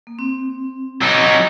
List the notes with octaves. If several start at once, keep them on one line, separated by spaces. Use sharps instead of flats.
A#3
C4
F#3 D#4